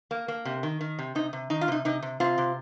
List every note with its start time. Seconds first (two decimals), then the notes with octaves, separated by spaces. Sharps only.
0.11 A#3
0.28 A#3
0.45 C3
0.63 D#3
0.81 D#3
0.99 C3
1.15 C3 D#4
1.33 C3
1.50 D#3 D#4
1.61 F4
1.68 C3 D#4
1.85 C3 D#4
2.02 C3
2.20 C3 C4 F4
2.38 C3